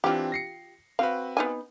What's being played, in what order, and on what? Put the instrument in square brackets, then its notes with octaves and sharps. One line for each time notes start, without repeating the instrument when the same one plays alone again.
[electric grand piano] E3 C4 D4 [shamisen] F4 G4
[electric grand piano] A#6 C7 C#7
[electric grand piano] C4 F#4 B4 [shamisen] F5
[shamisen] B3 D#4 G#5